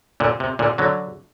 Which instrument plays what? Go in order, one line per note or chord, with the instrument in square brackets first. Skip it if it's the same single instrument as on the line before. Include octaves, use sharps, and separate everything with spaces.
[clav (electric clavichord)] A#2 D3
C3
A#2 D3
D3 F#3